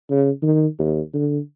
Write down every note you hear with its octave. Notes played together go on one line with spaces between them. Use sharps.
C#3
D#3
D#2
D3